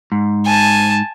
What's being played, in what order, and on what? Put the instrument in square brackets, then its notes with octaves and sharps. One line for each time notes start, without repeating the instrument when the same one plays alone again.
[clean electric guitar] G#2
[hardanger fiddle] G#5 A5